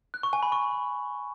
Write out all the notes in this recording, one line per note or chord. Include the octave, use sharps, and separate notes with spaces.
F#6
C#6
G#5
B5
C#6